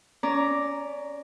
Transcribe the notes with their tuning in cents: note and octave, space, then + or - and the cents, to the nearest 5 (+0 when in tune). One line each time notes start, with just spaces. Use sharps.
C#4 +25 D5 +0 A#5 +0